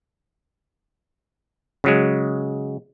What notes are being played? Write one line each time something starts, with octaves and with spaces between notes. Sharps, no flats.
C#3 F#3 G#3